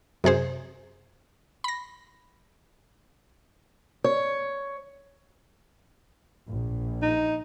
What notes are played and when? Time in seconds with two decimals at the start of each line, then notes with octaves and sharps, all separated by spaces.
0.24 F#2 C3 G#4 C5
1.64 B5 A#6
4.04 C#5
6.49 A#1
7.02 D#4